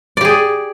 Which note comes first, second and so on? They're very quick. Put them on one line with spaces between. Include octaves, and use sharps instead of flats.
D5 G4 G#4